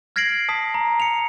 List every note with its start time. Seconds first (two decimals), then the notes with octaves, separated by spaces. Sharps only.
0.16 F6 G#6 A#6 C7 D7 F#7
0.49 A5 D#6 B6
0.74 A#5
1.00 C#7 F7